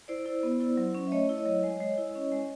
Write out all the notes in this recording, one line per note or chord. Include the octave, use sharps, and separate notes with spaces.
E4 C5 D5
E4
B3
E4
F#3
C#4
E5
A3 C#5 D#5
E4
C#5 D#5
F#3
G#3
G#3
E4
C#4
G#3